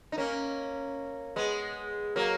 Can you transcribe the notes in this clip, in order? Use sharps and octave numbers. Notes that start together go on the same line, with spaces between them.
D#4
A#3 C#4
G#3 B3
F#3 A#3